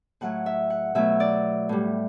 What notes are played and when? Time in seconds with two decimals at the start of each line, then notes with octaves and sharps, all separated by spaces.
0.21 A2 F#3 A3 F#5
0.46 E5
0.70 F#5
0.95 B2 F#3 A3 E5
1.20 D5
1.69 A2 G3